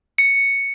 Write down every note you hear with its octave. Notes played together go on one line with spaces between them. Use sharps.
C#7